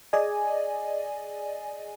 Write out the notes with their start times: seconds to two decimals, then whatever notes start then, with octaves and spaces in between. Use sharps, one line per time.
0.13 G#4 D5 D#5 G#5